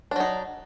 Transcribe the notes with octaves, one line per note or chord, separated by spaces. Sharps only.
F#3 D4 D#4